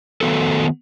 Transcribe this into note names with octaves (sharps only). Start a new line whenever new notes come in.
D#3 E3 A3 B3 F#4 A4